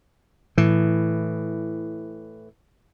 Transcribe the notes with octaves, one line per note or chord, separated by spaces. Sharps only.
A2 E3